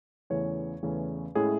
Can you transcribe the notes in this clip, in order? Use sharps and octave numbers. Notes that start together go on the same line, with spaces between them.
E2 C#3 E3 A3 C#4 C#5
E2 C#3 E3 A3 C#4
A2 G#3 C#4 E4 G#4